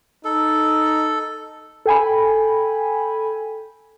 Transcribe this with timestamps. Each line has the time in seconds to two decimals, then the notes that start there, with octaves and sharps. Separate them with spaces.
0.25 D#4 A4
1.86 A4 G5 G#5 B5